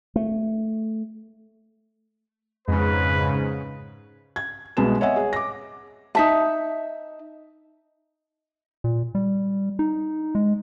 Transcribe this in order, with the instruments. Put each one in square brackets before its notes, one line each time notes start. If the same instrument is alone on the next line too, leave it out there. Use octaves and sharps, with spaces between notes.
[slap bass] A3
[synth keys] F2 [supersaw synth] G#2 C#3 [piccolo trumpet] B4
[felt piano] G#6
C2 B2 G#3 B4 E7
C#5 D#5 E5 F#5 G#5
G#4 C#5
D6 A#6
[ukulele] D#4 E5 A5
[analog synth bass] A#2
G3
D#4
G#3